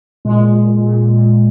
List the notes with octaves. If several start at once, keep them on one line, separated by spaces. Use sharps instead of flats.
A#2 G#3
A#2
A#2
A#2